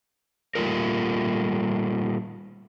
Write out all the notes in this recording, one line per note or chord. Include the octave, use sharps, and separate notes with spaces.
A#2 G3 A3 F4 A#4